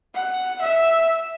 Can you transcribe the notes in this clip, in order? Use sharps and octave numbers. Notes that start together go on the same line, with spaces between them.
F#5
E5